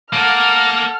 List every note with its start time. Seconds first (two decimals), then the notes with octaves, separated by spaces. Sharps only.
0.13 A#3 A4 A#4 F#5 F6